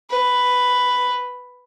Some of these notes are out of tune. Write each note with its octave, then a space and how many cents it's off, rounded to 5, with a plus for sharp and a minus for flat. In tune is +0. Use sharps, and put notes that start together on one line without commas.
B4 +5